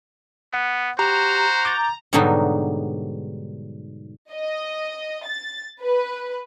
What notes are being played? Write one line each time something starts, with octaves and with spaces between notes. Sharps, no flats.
B3 F#5
F#4 G4 C5 A#5
D6 G6 A6
G#2 B2 D3 F#3 G3 D#4
D#5
A6
B4